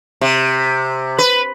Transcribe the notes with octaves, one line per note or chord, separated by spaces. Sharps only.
C3
B4